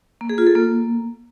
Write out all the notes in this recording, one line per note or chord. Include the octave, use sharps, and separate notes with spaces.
A#3
G#4
F4
A4
A#3